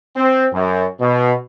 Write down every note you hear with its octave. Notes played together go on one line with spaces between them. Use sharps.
C4
F#2
B2